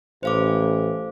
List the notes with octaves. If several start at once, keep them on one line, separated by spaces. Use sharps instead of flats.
A1 C5 F5 D6